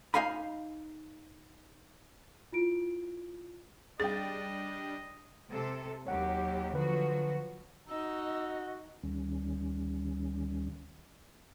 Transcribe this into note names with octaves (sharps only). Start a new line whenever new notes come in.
D#4 D#5 F5 G#5 B5
E4 F4 D7
G3 D4 G#4 D#5 G5 A6
C3 A4
D#2 F#3 G4 C#5 F#5
D3 F3 F#3 F#4 B4
D#4 F#4 D#5 E6
D2 D#3 G3 C#4